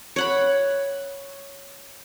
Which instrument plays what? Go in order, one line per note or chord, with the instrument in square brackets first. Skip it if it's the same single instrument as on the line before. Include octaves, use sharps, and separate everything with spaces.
[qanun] C#5 F#5 B5